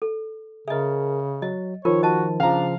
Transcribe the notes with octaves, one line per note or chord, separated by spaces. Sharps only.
A4
C#3 G#4 A#4 D#5 E5
F#3 D#5
D#3 F3 F4 A#4 C#5
F#4 D#5 A5
C#3 F3 D4 F5 A#5